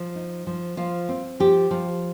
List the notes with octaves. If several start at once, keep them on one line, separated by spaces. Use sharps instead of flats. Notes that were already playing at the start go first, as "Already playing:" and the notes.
Already playing: F3
D#4
F3
F3 F4
C4
F3 G4
F3